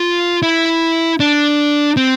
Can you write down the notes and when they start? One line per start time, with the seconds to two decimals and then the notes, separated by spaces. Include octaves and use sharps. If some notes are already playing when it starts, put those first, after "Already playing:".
Already playing: F4
0.42 E4
1.20 D4
1.97 C4